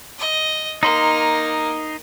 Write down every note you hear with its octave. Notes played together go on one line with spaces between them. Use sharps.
D#5
A#3 D#4 C6